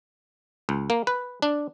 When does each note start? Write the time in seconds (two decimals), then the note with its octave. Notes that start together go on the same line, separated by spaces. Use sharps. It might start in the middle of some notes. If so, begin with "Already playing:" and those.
0.69 C#2
0.90 A#3
1.07 B4
1.42 D4